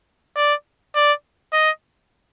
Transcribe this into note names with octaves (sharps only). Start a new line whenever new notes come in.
D5
D5
D#5